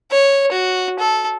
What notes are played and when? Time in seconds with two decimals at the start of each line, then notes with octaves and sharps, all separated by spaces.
0.11 C#5
0.52 F#4
0.99 A4